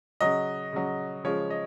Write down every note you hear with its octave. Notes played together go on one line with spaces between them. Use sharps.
C#3 F#3 D#5
C#3 F#3
C#3 F3 G#3 C#5
D#5